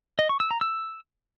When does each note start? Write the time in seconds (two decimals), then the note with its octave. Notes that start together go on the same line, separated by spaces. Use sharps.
0.19 D#5
0.29 C#6
0.40 E6
0.51 A#5
0.61 E6